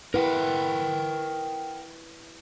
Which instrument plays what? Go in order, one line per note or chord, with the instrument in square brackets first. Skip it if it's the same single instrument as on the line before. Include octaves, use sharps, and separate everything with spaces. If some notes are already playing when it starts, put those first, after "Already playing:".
[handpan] E4 B4 [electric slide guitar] A#4 F#5 G5